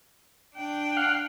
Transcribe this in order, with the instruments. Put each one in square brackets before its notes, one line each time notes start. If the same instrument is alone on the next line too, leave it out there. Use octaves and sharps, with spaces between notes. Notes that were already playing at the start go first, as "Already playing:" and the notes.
[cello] D4 G5
[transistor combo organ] F5 F#5